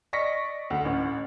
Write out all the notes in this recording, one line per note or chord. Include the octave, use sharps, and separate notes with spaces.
D5 D#5 C#6 A#6 B6 C#7
D2
A1 C#4